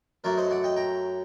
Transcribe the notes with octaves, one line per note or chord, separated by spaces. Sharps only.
F#2 F#3 A3 A#4 D5
C5 D#5
D5 F#5
D#5 G5
G5 A#5